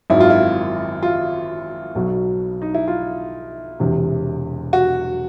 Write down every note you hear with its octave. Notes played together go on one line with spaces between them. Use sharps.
G#1 F#2 D#3 E4
F4
E4
F4
B1 B2 F#3
D#4
E4
F4
E1 E2 C3
F#4